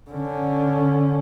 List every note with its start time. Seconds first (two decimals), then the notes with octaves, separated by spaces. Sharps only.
0.10 D3 C#4